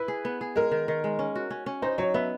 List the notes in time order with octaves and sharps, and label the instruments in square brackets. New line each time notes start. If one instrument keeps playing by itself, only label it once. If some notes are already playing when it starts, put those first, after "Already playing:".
Already playing: [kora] E4 [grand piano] B4
[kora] G#4
B3
G#4
[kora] G#3 [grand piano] A#4
[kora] D#3
D#3
G#3
C#4
F#4
C#4
C#4
[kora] D#4 [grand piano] C5
[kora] F#3 [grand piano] C#5
[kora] B3 [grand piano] E5